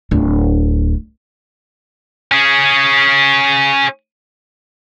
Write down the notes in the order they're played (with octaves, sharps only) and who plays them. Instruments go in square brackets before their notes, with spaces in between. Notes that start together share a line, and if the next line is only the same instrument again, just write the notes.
[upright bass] D1 D4
[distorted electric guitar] C#4 G#4